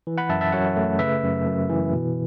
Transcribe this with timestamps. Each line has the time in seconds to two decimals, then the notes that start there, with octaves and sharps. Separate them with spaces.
0.07 E3
0.18 F#5 B5
0.29 F#2 E5 A5
0.41 E5 A5
0.52 F#2 C#5 F#5
0.77 A3
0.99 C#3 B4 E5
1.23 F#2
1.46 F#2
1.69 E3
1.93 B2